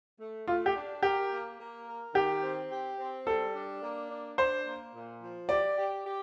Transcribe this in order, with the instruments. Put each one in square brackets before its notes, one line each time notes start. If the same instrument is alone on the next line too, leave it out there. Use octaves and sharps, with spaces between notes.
[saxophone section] A3
[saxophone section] A3 [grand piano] F4
[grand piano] G4
[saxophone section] D4
[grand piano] G4 [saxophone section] A#4
[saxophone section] A#3
A#3
A#4
[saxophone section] D#3 [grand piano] G4
[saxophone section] C4
G4
C4
[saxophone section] G3 [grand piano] A4
[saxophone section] D4
A#3
D4
[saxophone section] D4 [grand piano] C5
[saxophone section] A#3
A#2
F3
[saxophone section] G4 [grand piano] D5
[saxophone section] G4
G4